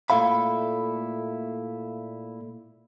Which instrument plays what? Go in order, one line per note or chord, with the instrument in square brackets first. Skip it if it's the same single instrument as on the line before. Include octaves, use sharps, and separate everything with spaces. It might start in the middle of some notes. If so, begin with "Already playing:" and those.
[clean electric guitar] A#2 A3 E4 F5 B5